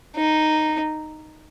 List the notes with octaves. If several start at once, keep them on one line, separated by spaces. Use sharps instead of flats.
D#4